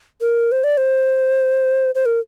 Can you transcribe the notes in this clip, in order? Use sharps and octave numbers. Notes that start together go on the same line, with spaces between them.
A#4
C5
D5
C5
C5
A#4